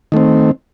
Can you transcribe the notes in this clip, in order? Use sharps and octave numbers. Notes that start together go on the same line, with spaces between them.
D#3 A3 C4